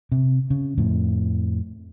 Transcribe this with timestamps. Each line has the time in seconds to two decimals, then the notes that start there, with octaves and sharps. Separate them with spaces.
0.12 C3
0.50 C#3
0.78 F2 A2